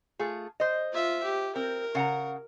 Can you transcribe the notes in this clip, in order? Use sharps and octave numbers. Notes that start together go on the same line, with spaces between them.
A3 F4 G#4
C5 D#5
F4 E5
G4
C4 A#4
C#3 F#5 A#5